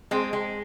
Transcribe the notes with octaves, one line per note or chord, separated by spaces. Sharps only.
G#3 C4
G#3